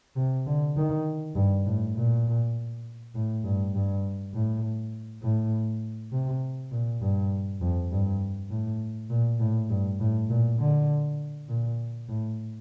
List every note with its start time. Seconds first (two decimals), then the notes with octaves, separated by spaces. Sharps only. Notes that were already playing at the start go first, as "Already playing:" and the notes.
0.16 C3
0.46 D3
0.77 D#3
1.35 G2
1.66 A2
1.96 A#2
3.15 A2
3.44 G2
3.74 G2
4.34 A2
5.22 A2
6.12 C3
6.72 A#2
7.01 G2
7.61 F2
7.92 G2
8.50 A2
9.10 A#2
9.40 A2
9.70 G2
10.00 A2
10.29 A#2
10.59 D3
11.49 A#2
12.09 A2